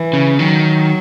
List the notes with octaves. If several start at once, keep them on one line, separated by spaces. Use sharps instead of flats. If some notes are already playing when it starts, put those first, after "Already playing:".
Already playing: E3
C#3
D#3 F#3